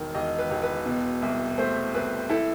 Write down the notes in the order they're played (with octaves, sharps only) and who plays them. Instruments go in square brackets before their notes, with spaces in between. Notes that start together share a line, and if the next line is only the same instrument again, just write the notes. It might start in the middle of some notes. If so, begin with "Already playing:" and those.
Already playing: [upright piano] E1 D#3
E1 D#5
B4
E1
B4
B2
C2
A3 C5
C2 B4
E4 A4